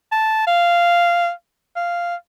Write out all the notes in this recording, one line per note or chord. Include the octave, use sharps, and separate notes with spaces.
A5
F5
F5